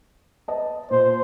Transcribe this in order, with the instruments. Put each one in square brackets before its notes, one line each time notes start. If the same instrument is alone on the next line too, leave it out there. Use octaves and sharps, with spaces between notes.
[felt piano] B4 D#5 A5
[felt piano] A#2 [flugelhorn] C5